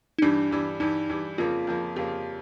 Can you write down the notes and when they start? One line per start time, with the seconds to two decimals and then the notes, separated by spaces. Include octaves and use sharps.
0.19 D#4
0.22 G2 E3 G3 D4
0.51 G2 E3 G3
0.80 G2 E3 G3 D#4
1.09 G2 E3 G3
1.38 F2 C#3 F3 A#3 F4
1.67 F2 C#3 F3 A#3
1.96 F2 C#3 F3 A#3 G4